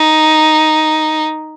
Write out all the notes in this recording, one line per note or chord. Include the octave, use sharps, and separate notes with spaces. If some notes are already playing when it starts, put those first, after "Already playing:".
Already playing: D#4